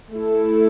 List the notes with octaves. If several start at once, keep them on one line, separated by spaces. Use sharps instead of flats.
A3 E4 A4